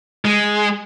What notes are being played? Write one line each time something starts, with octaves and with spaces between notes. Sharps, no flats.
G#3